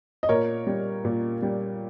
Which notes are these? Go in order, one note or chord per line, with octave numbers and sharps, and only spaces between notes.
D#5
A#2 A#4 C#5
G3
A#2
G3